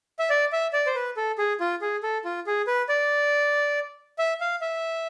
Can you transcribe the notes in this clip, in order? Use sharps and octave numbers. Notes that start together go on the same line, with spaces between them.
E5
D5
E5
D5
C5
B4
A4
G#4
F4
G#4
A4
F4
G#4
B4
D5
E5
F5
E5